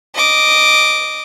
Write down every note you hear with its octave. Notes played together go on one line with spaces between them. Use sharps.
D#5 D6